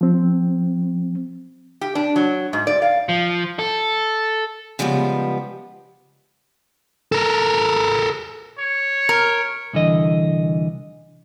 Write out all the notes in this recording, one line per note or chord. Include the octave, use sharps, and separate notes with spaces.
F3 C4
G4
D4
F#3
G#2
D5
F5
F3
A4
C#3 F3 G3 G#3 B3
A4 A#4
C#5
A#4
C2 D3 E3 D#5